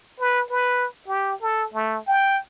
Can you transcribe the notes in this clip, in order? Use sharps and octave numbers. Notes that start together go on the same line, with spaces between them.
B4
B4
G4
A4
A3
G5